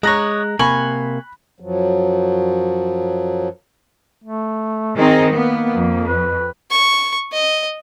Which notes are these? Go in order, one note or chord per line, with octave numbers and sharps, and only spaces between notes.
G#3 C#5 D#5 A#5 F#6 A#6
C3 A#3 G#5 B5 C#6 F#7
F#2 F3 F#3
A3
D#3 C4 D#4 G#4
A#3 B3
F2
B4
C#6
D#5